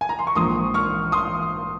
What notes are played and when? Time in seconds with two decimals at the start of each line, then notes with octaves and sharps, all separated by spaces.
0.01 G#5
0.09 A#5
0.19 C6
0.27 C#6
0.35 A#1 G#2 F3 A#3 C6 D#6
0.74 C#6 F6
1.12 C6 D#6